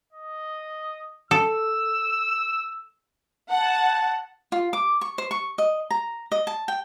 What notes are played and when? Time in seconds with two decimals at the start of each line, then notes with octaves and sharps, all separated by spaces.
0.13 D#5
1.31 A4 E6
3.50 F#5 A5
4.52 F4
4.73 D6
5.01 C#6
5.18 C5
5.31 C#6
5.58 D#5
5.91 A#5
6.32 D#5
6.47 A5
6.68 G5